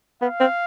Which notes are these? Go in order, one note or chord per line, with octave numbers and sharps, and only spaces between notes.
B3 F5
C4